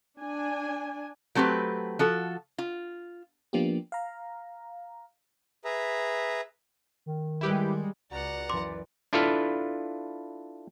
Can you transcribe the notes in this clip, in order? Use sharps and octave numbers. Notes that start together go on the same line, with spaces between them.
D4 G#5
F#3 A3 C4 G4 B4
F3 F#4 A4
F4
F3 A#3 B3 D4 F4 G4
F5 A#5
G#4 B4 E5 A#5
D#3
G3 G#3 E4 G4 B4
C#2 F#4 B4 D5 F#5 A#5
F#2 E3 C6 D6
D4 E4 F4 A4 B4 F5